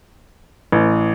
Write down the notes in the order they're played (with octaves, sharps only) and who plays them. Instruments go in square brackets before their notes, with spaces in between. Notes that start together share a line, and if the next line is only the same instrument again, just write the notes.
[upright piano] A1